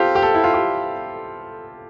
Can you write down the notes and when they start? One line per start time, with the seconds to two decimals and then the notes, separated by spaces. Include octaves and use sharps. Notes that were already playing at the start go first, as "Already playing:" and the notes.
Already playing: C4 F4 G4 A4
0.15 G4
0.22 A4
0.35 E4
0.44 F4
0.54 G4